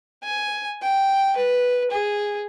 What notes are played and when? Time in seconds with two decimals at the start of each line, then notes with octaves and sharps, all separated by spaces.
0.24 G#5
0.82 G5
1.37 B4
1.91 G#4